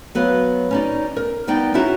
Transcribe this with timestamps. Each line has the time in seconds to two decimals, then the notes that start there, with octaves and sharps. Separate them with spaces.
0.15 F#3 B3 B4 F5
0.71 C#4 D#4 D5
1.16 A#4
1.47 G3 B3 D#4 D5 G5
1.74 C#4 D#4 E4 F#4 G#4